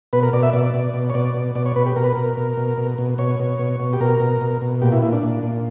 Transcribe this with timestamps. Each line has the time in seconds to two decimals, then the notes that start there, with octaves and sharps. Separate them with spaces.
0.13 B2 B4
0.23 A#4
0.33 B2 D5
0.43 E5
0.53 B2 D5
0.63 D5
0.74 B2
0.94 B2
1.10 C#5
1.14 B2 D5
1.34 B2
1.55 B2 D5
1.66 C#5
1.76 B2 B4
1.86 G4
1.96 B2 A#4
2.04 B4
2.12 B2 A#4
2.37 B2
2.57 B2
2.78 B2
2.98 B2
3.18 B2 C#5
3.40 B2
3.59 B2
3.80 B2
3.93 G4
4.01 B2 A#4
4.20 B2
4.41 B2
4.62 B2
4.82 A#2 G4
4.92 E4
5.02 A#2 E4
5.13 D4
5.23 A#2
5.43 A#2